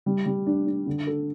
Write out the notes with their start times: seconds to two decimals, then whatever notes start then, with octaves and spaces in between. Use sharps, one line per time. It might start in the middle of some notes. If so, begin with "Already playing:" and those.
0.06 G3
0.26 G3
0.47 D4
0.66 D4
0.87 D3
1.07 A4